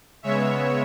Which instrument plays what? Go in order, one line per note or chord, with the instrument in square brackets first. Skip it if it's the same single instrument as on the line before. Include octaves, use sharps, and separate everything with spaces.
[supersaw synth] C#3 G#3 B3 C#5 E5